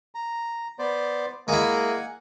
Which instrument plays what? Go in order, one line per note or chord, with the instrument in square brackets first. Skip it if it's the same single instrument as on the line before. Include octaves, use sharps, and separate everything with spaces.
[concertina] A#5
B3 C5 D5
[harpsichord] G#3 E4 [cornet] A#3 [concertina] F#5 G#5